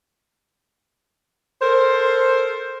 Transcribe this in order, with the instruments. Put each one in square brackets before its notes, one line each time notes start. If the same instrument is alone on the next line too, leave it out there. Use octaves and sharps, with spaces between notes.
[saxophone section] A4 A#4 C5